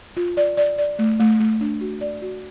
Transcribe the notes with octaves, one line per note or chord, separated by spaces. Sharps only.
F4
D5
D5
D5
A3
A3
A3
D4
F#4
D5
F#4